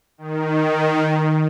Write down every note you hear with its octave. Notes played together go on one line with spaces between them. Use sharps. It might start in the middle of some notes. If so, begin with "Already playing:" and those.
D#3